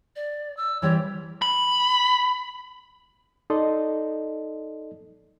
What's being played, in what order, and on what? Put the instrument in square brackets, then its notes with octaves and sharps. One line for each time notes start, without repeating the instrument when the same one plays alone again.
[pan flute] D5
E6
[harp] E3 G3 C4 [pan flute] C#5
[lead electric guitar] B5
[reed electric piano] D#4 A4 D5 D#5 C6